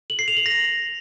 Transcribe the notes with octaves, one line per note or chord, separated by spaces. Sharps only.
F#7
C7
F7
F#7
A#6